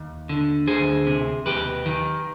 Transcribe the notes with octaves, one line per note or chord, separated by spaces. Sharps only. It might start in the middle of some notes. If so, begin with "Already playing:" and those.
Already playing: D#2
D3
D2 G#4 C5
C3
D#2 G4 B4
D#3